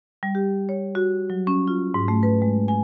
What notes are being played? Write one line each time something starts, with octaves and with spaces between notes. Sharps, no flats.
G3
G4
C#5
F#4
F#3
C#4
F4
G#2
A3
B4
G#3
G#5